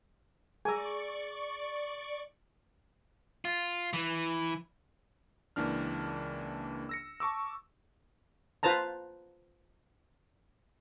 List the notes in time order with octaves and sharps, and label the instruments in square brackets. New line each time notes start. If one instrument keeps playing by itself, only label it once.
[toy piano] G#4 E6 [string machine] D5 C#6 [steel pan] G#5 A#5
[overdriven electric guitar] F4
E3
[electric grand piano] C#2 E3 A#3 D4 F6
E6 A#6 C#7
A5 C#6 D6 E6
[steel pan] F4 B4 C5 A5 A#5